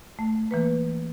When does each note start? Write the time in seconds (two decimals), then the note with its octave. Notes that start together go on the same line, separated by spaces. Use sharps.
0.19 A3
0.51 E3 A#3 B4